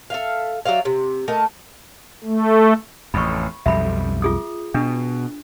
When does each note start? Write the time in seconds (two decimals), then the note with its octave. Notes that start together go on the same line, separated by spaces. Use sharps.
0.10 A4 E5 F5
0.66 F#3 D5 E5 F5
0.85 C3
1.28 A3 A#4 D#5 A5
2.24 A3
3.14 A1 F2 B5 C#6
3.66 B1 F2 G3 E5 B5
4.22 F4 G#4 D#6
4.74 B2 D4